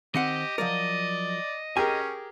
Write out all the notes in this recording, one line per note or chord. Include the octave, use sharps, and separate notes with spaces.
D#3 C4 G4 D#5 F#5
F3 F#3 A#4 D5
C#4 G4 G#4 A#4 G#5